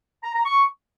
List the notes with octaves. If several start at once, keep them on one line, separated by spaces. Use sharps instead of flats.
A#5
A#5
C#6